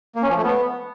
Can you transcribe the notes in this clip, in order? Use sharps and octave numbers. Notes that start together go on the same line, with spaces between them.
A#3
C#4
F3
A3
B3